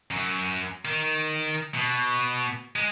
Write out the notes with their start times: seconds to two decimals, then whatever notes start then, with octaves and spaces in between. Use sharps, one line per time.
0.11 F#2
0.85 D#3
1.74 B2
2.76 G#3